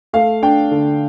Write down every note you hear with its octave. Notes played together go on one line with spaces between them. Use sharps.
A3 F5
D4 G5
D3